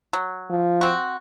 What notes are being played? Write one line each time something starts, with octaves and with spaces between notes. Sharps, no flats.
F#3
F3
C4 F#4